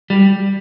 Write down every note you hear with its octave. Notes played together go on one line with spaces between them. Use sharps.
G3